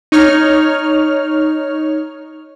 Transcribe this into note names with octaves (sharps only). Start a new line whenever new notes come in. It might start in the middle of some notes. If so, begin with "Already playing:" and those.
D#4 C#5 F6